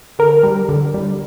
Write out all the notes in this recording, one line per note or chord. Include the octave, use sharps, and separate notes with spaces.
D3 A#4
G3
D3
G3